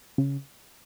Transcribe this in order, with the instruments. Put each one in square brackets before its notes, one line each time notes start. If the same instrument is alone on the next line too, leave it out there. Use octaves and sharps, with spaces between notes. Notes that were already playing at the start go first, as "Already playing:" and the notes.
[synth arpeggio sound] C#3